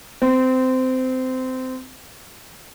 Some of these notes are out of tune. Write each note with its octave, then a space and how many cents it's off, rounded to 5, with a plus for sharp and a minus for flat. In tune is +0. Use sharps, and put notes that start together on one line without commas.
C4 -20